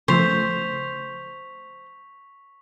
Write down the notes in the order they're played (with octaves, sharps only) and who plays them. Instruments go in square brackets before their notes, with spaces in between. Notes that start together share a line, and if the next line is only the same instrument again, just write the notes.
[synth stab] C#3 F3 A3 [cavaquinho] C5 [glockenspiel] C#6 B6 F7